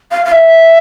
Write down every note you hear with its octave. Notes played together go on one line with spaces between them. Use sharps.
F5
F5
E5